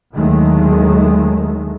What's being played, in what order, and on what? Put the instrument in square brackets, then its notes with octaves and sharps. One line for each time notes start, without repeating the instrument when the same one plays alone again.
[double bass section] D#2 D3 D#3 F#3 G#3 A3